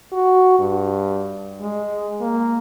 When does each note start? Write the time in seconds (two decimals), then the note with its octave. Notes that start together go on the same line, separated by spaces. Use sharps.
0.13 F#4
0.59 G2
1.61 G#3
2.21 A#3